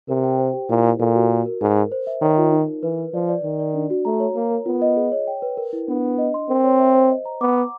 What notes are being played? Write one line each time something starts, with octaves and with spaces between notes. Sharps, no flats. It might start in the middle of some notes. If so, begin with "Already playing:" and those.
C3 A#4
G5
C5
G4
A#2 E4
E4
A#2 A4
F#4
A#4
A#4
G#2 A#4
A#4
C5
E5
D#3 C#5
F4
D#4
A#4
E3 B4
B4
F3 D5
D5
D#3 D5
D5
D4
F#4
A3 A#5
C#5
A#3 A#4
A#4
B3 F4
D#5
G#4
C#5
G5
B4
A#4
E4
B3 D4
D4
D#5
C6
C4 A#4
C#5
E5
C5
D#5
A#5
B3 D6
F#5